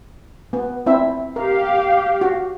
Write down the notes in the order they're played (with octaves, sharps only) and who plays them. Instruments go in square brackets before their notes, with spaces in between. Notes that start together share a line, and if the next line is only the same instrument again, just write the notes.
[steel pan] B3
C4 E4 E5
[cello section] G4 F5 [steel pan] A#4
[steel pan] F#4